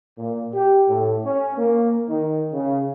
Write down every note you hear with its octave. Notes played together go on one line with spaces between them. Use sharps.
A#2
G4
A2
C#4
A#3
D#3
C#3